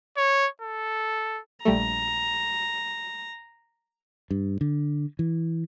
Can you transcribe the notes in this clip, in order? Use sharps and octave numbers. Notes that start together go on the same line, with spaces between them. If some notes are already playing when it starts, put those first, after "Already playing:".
C#5
A4
A#1 G3 A3 A#5
G2
D3
E3